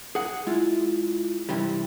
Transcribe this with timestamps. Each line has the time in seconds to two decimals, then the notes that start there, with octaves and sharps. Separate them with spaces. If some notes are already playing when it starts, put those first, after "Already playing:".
0.15 G#4 F#5
0.47 G#3 E4 F4
1.49 G2 C3 E3 G3